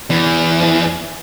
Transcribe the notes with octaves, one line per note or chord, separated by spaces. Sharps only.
E2 E3